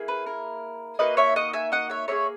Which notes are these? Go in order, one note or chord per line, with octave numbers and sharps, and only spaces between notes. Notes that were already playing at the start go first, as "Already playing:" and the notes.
Already playing: A#3 E4 G#4
B4
A#4
A#3 D#4 F#4 B4 D#5
C#5 E5
D#5 F#5
E5 G#5
D#5 F#5
C#5 E5
A#3 E4 G#4 C#5 E5